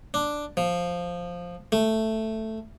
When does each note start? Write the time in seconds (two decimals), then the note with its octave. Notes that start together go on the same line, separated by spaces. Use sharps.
0.14 D4
0.57 F3
1.72 A3